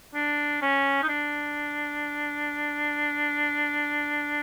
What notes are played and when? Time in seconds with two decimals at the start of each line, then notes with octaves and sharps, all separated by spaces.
0.14 D4
0.62 C#4
1.03 D#4
1.08 D4